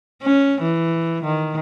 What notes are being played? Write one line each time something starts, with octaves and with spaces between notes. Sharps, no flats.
C#4
E3
D#3